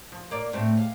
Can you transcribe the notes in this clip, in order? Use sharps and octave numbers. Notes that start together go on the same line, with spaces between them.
F3
A#3 D5
A2 A3 C4
F5